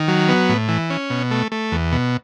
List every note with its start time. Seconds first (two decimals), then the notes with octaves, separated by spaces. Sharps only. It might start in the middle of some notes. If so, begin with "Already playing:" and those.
Already playing: D#3
0.08 F#3
0.28 B3
0.49 A2
0.68 E3
0.90 C#4
1.10 B2
1.31 A3
1.52 A3
1.72 E2
1.92 B2